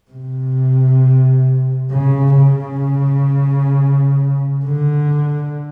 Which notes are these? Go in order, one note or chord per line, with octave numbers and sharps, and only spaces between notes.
C3
C#3
C#3
D3